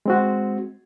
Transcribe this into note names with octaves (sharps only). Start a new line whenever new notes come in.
G#3 C4 F#4